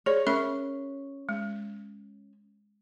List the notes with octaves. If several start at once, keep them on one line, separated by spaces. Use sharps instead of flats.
G#4 C#5 D5
C#4 A#4 E5 B5
G#3